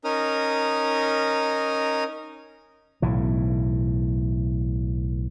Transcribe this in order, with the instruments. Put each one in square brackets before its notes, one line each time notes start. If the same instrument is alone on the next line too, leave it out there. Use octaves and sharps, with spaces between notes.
[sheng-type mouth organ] C#4 D#4 A#4 D#6 F6
[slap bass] B1 A2 E3